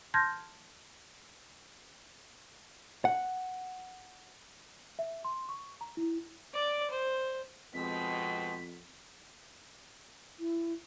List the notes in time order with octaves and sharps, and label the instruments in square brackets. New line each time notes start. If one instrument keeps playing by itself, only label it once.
[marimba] A5 C6 F6 G6 G#6 A#6
[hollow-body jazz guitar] F#5
[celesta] E5
C6
C#6
A#5
E4
[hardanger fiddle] D5 D6
C5
[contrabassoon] F2 [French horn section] B2 G#3 C4 [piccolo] B6
[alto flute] E4